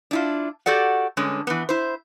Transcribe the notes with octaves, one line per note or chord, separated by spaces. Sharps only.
D4 E4 F4
F#4 G4 A4 D5 F#5
G2 D3 G#3 C#4
E3 B3
E4 C5